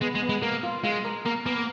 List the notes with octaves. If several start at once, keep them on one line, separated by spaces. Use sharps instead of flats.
G#3 B3
G#3
B3
G#3
A#3 A#4
F4
G#3 F4
A#4
A#3 A#4
A#3 B3